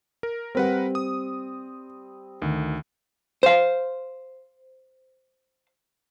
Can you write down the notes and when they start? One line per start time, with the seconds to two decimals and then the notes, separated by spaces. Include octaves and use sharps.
0.23 A#4
0.55 G3 C4 A#4 B4 F#5
0.95 D#6
2.42 D2 D#3
3.43 C5 F5